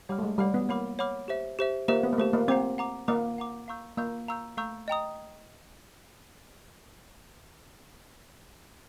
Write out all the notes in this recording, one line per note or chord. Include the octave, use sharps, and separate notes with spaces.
G3 C#5 F#5 B5 D6 F6
A3
G#3
G3 C#5 F#5 B5 D6 F6
B3
A#3 C#5 F#5 B5 D6 F6
C#5 F#5 B5 D6 F6
G4 C5 E5
G4 C5 E5
A#3 G4 C5 E5
B3
A#3
A3 G4 C5 E5
A#3
C4 F#5 A#5 D6
F#5 A#5 D6
A#3 F#5 A#5 D6
F#5 A#5 D6
F5 A#5 C#6 E6 G6
A#3 F5 A#5 C#6 E6 G6
F5 A#5 C#6 E6 G6
A3 F5 A#5 C#6 E6 G6
D#5 G5 A#5 D#6